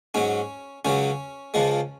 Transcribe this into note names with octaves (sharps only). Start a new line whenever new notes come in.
G#2 F#3 C#4
C#2 C#3 F#3 C#4
C#2 C#3 F3 G#3